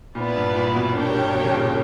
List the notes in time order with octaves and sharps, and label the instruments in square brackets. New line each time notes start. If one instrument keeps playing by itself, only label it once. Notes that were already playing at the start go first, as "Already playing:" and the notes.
[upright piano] A#2 [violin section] B3 E4 B4 D5
[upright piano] G2
A#2
B2
[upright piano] B2 [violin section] D4 G4 A#4 C#5 G5
[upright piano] G2
B2
C#3
A#2